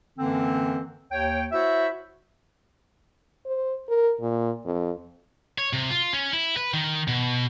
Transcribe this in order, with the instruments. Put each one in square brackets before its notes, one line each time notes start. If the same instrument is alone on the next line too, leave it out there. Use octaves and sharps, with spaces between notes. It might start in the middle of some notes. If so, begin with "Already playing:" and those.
[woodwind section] F#2 D3 E3 A#3 C4
D#2 C#5 G5
E4 F#4 C5 C#5 E5
[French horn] C5
A#4
A#2
F2
[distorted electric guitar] C#5
C3
F4
C#4
E4
B4
D#3
B2